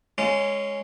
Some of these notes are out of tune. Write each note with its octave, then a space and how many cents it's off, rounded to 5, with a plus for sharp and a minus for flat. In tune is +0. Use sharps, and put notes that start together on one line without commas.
G#3 +0 C#4 +0 F4 -35